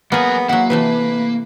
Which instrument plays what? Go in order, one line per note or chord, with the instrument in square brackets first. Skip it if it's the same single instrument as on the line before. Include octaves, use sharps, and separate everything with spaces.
[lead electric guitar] F#3 G#5 [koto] A#3 G#4 [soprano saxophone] B3
[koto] F#3 E4 [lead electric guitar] A#3 [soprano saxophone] F#5
[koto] C3 E3 A3 [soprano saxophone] B4